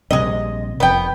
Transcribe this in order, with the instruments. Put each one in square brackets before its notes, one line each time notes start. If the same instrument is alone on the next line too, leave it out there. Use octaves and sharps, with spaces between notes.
[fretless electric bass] A#1 C3 G3 [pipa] G#3 D#5
[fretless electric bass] F1 F2 [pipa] B3 G5